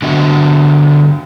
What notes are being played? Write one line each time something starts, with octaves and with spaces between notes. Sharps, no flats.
D3 B3 F#4 D#5 E5